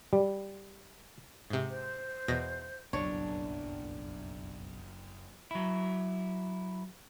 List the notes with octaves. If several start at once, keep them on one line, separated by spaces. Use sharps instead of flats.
G3
G#2 C3
C5
E2 B2 A#6
F#1 B1 F2 A2 D4 C#5
F#3 E4